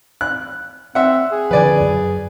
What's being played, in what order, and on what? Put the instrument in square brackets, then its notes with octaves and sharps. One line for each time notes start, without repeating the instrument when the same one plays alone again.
[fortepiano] F#6
[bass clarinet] C4 [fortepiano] E5 F#5
[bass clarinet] G#4
[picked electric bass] D3 F3 [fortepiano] B4 D5 G#5
[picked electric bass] F#2